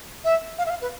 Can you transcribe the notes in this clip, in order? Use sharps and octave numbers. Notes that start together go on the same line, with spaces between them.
E5
F5
E5
F5
B4